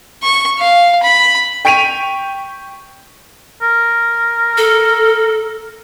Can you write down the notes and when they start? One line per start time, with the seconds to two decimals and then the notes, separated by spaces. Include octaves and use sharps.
0.23 C#6
0.59 F5
1.03 B5
1.65 G5 C#6 B6 D7 D#7 F7
3.62 A#4
4.58 A4